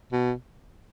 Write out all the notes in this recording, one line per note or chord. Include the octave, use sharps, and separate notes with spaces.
B2